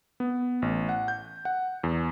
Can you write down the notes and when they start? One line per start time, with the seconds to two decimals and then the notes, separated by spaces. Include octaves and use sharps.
0.20 B3
0.62 A1
0.89 F#5
1.08 G6
1.45 F#5
1.83 E2